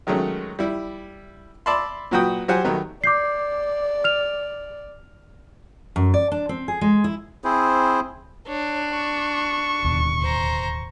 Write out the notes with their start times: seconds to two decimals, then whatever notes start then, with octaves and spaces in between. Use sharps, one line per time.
0.07 D#3 F#3 G#3 A3 C#4
0.59 G3 E4
1.66 D5 E5 A5 B5 C6
2.11 A#2 F#3 F#4 B4 G5 D#6
2.48 F#3 G4 C5 F#5 G#5
2.64 B2 D#3 F#3 A3 B3
3.04 D5 D6 G6 C7
4.04 F6 F7
5.96 F#2
6.14 D5
6.32 D4
6.49 C4
6.68 G#4
6.81 G#3
7.04 E4
7.44 C4 E4 G#4 C5
8.48 D4 C#5
8.94 C#6
9.84 D1 D#2 B2
10.22 C5 A#5